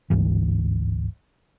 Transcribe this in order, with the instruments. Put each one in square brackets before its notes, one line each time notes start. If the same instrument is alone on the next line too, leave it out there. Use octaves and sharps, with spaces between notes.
[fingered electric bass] G1 D2 G#2 E3